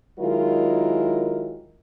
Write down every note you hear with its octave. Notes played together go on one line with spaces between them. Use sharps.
D#3 F#3 G#3 E4 F4 A#4